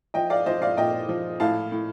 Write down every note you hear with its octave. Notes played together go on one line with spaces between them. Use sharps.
F3 D#5 G5
D5 F5
F3 C5 D#5
D5 F5
A#2 D#5 G5
F3
A2 F5 A5
A2